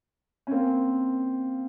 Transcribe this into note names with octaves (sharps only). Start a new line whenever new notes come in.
C#4
A#3 C4